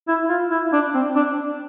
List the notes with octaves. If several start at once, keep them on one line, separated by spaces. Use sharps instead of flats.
E4
F4
E4
D4
C4
D4